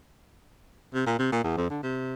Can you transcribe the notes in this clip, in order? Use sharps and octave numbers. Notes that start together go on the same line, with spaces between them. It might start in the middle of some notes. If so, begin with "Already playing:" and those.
C3
A#2
C3
A#2
E2
F2
D3
C3